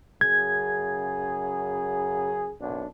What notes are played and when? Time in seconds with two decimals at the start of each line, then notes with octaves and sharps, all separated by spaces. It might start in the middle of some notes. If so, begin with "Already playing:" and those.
0.21 F#2 C#3 G#4 G#6
2.60 B1 F#2 D4